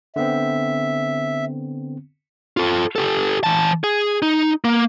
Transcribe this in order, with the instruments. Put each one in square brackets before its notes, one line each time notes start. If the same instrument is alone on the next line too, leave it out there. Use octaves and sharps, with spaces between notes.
[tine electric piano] D3 B3 C4 [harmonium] E5
[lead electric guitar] F4 A4
G4 A4
E3 A5
G#4
D#4
A#3